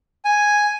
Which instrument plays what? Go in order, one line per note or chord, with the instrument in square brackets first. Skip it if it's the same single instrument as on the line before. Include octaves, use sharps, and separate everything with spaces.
[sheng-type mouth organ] G#5